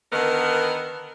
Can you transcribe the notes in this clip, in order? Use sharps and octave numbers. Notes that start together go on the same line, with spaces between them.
D3 D#3 B3 A#4